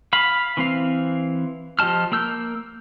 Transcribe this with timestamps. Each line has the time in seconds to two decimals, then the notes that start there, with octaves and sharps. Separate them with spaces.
0.13 F5 B5
0.57 E3 C4 F5
1.79 F3 G4 D#5 A5 F6
2.12 A#3 A#4 E6 G6